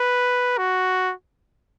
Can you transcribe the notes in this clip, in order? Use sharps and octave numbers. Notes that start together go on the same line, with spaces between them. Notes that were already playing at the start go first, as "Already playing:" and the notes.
Already playing: B4
F#4